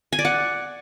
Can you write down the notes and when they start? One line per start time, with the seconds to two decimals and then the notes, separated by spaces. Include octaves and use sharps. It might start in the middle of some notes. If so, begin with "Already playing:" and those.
0.13 G#5
0.19 D5
0.25 F#5